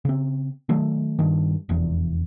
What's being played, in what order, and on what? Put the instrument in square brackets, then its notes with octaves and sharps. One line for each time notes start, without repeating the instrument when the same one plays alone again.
[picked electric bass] C#3 C4
D#3 F#3 A3
G2 D#3
F1 E2